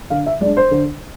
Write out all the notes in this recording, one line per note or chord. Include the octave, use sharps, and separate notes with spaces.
D3 F5
E5
G#3 D4 D5
C5
D3